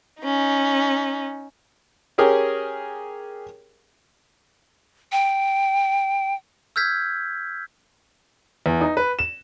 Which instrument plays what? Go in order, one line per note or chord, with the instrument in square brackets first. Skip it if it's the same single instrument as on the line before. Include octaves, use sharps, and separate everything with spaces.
[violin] C#4 D#4
[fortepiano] C#4 G4 G#4 A#4
[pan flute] G5
[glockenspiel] E6 F6 G6 G#6 B6
[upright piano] E2
D#4
B4
E7